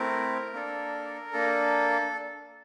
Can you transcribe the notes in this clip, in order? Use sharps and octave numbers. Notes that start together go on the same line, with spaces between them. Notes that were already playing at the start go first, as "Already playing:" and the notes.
Already playing: A3 C4 E4 A#4
A#3 D4 A4
A#3 D4 A4